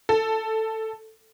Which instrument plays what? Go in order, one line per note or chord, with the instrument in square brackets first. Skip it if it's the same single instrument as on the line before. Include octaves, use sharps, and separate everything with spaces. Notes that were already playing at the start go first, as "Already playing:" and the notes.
[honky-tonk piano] A4